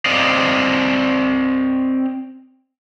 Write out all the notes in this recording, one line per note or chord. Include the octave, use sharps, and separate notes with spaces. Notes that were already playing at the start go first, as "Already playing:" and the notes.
C4 D5 D#5 F5